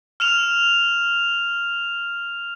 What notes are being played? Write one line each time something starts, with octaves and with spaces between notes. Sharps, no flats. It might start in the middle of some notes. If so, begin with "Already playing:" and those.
F6 E7 F7